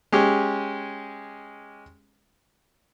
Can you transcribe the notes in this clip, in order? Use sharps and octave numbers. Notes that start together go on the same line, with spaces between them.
G#3 C#4 G4